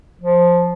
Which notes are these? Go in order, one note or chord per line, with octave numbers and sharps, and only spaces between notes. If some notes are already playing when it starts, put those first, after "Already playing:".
F3